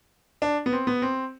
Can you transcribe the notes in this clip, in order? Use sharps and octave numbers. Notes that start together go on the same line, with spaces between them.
D4
B3
C4
B3
C4